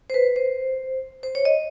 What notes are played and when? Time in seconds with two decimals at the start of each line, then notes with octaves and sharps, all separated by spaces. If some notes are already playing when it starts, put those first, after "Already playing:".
0.10 C5
0.14 B4
0.36 C5
1.23 C5
1.35 C#5
1.45 D#5